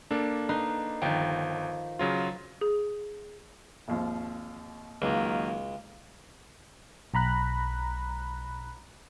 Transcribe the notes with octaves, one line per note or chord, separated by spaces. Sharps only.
A#3 D4 A4
D#4 B4 C6
G1 D#3 F3 G5
C#3 F#3 F4
G#4
G#1 D#2 F3
C#2 D#3 F#3 A#3
B1 A#5 B5 F#6